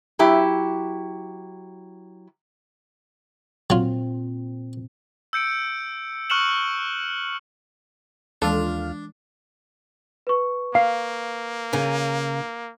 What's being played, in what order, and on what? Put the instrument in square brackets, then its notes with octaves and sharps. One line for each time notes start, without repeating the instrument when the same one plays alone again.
[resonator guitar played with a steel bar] F#3 E4 G4
[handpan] A#2 C4 [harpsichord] F#3 F4
[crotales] E6 G6 C#7 D7
C#6 F6 F#6 C#7 E7 F#7
[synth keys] D#2 F4 F6 [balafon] E3 G#3 D5 [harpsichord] D4 [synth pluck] A4
[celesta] B4 C#6
[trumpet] A#3 [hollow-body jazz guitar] F5
[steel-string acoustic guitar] C#3 A#4 G#5